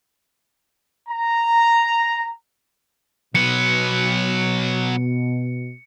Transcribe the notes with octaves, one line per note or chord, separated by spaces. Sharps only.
A#5
B2 F#3 B4 C#7